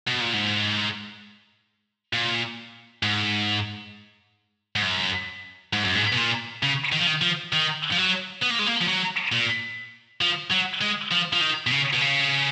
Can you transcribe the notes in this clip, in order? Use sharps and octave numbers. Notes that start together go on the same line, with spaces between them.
B2
A#2
G#2
A#2
G#2
G#2
F#2
G#2
F#2
G#2
B2
A#2
C#3
D#3
F3
D#3
F3
D#3
F3
F#3
B3
A#3
G#3
A#3
F3
F#3
A#2
F3
F#3
G#3
F3
F3
D#3
B2
C#3
B2
C#3